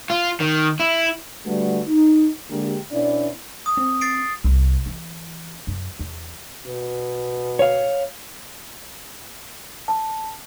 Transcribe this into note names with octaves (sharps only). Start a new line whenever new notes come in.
F4
D#3
E4
D3 G3 A3 B3 F#4
D#4
D3 G#3 A#3 G4
B2 B3 C#4 D4 E4 D5
D#6
C4
A6 C7 D7
C2
E3
F#2
E2
B2
C#5 F5
A5